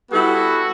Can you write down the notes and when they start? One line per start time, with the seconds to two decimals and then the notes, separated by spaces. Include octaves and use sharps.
0.11 G3 B3 E4 F#4 A4